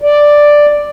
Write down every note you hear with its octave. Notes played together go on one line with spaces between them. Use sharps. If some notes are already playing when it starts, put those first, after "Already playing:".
D5